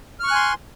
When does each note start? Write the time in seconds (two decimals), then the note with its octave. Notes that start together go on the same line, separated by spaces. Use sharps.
0.20 F6
0.24 C#6
0.27 F#6
0.31 G#5
0.35 C6